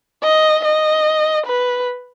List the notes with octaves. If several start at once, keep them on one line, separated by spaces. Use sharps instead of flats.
D#5
D#5
B4